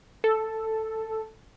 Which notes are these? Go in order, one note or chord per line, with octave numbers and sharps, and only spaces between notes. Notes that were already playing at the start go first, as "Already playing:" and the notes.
A4